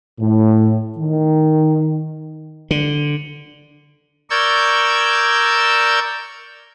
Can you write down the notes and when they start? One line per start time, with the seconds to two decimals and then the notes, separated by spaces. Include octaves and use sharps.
0.19 A2
0.97 D#3
2.71 D3
4.30 A#4 D5 C#6 E6 G6 G#6